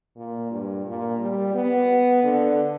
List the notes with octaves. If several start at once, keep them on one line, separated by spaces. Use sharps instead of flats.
A#2
G2
A#2
G3
B3
D3